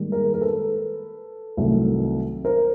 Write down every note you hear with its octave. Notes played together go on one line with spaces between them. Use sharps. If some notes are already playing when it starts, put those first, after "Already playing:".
Already playing: G#2 D#3 G3 A#3
G#4 A#4
A#4
A4 B4
C2 C3 D#3 F#3 A3
A#4 C5